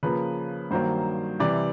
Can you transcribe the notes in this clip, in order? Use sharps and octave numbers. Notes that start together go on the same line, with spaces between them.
C#3 F3 A#3 B4
G2 D#3 F#3 A#3 C5
C3 E3 G3 C4 D5